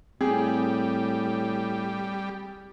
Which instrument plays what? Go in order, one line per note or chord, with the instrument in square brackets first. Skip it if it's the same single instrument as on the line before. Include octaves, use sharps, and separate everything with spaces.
[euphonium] A2 [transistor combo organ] G3 [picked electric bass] C4 [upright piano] G#4